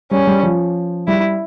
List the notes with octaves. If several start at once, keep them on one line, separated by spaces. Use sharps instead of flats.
G3 C#4
G3
F3
G3 E4